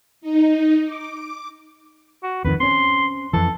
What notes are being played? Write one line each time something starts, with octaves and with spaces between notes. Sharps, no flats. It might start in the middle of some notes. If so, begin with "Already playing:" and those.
D#4
D6
F#4
D1 F2 D#3 B4
C4 C#4 C6
F2 E3 A4